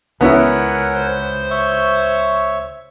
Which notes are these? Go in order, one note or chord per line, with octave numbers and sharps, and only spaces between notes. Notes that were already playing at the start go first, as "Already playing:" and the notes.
C#2 B3 C#4 E4 A#4 F#5 G#5
C5
C#5 E5 C#6